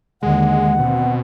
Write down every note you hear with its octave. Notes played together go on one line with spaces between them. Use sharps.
D#2 D3 G#3 F#5
B2 C4